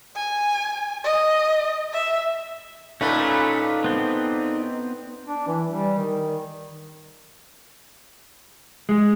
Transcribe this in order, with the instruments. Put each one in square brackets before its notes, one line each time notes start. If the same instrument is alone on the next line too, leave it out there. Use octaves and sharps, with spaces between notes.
[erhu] G#5
D#5
E5
[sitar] A#2 A3 [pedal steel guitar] C#4 B4 [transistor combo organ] D#4
[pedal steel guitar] B3 C4
[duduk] D4
E3
G3
D#3
[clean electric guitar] G#3